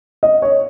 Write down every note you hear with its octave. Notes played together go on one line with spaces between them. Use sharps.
D#5
C#5